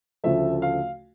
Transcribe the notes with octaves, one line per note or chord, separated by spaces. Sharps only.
D2 C#3 F3 A3 E5
F5